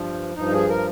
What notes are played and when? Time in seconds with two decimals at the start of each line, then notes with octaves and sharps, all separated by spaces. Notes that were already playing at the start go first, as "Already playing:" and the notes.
Already playing: G2 F3
0.36 G2 F3 D#4
0.52 G#4
0.69 A#4